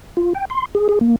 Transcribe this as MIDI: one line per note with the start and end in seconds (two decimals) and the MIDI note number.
0.17 0.33 65
0.34 0.45 79
0.50 0.66 84
0.75 0.88 68
0.89 0.99 68
1.01 1.16 58